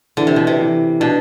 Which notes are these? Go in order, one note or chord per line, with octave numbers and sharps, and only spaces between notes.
D3 E3
C3
B2
C3
E3
B2 D4